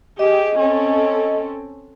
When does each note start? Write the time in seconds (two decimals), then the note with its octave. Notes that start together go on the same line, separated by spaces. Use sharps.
0.19 G4 G#4 D#5
0.59 C4 C#4 A4